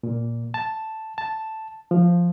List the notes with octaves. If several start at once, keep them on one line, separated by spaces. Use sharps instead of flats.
A#2
A5
A5
F3